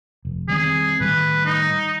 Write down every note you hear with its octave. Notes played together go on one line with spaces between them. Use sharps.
F1
D#3 G3 C4 G#4
A2 D#3 G3 B4
D#4